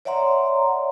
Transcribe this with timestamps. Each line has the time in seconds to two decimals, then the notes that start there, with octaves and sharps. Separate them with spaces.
0.05 C#5 D5 E5 F#5 A#5 C6